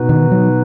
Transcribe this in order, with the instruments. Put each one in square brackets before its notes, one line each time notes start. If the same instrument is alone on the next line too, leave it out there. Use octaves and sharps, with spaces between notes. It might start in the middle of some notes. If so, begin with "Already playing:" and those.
Already playing: [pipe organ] B2 B3 D#4 F#4 B4
[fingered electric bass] D#3
F#3